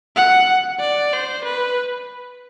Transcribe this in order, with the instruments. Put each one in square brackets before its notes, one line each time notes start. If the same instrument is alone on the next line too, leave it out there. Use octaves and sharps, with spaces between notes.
[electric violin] F#5
D5
C5
B4